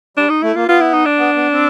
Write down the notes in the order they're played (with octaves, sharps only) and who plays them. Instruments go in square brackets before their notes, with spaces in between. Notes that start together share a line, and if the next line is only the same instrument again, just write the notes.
[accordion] G3 [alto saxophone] D4
[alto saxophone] D#4
[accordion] A3 [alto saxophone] E4
[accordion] A#3 [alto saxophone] F4
[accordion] B3 [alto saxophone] F4
[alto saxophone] E4
D#4
D4
[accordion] B3
B3
C4